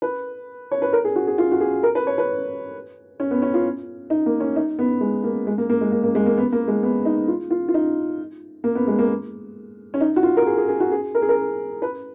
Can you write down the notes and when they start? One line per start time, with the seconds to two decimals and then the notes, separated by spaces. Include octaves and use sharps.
0.02 B4
0.71 C#5
0.82 B4
0.93 A#4
1.04 G#4
1.16 F#4
1.27 G#4
1.38 F4
1.52 F#4
1.61 G#4
1.83 A#4
1.95 B4
2.07 C#5
2.18 B4
3.20 C#4
3.31 B3
3.42 C#4
3.54 F4
4.10 D#4
4.26 A#3
4.40 C#4
4.56 D#4
4.79 B3
5.01 G#3
5.24 A#3
5.47 G#3
5.58 A#3
5.70 A#3
5.81 G#3
5.92 A#3
6.03 A#3
6.15 G#3
6.26 A#3
6.38 B3
6.52 A#3
6.68 G#3
6.83 B3
7.05 D#4
7.28 F4
7.51 F4
7.69 F4
7.74 D#4
8.64 A#3
8.75 B3
8.87 G#3
8.99 A#3
9.94 C#4
10.01 D#4
10.16 F#4
10.23 F4
10.37 A#4
10.46 G#4
10.58 G#4
10.69 G#4
10.80 F#4
10.92 G#4
11.15 A#4
11.22 G#4
11.29 A#4
11.82 B4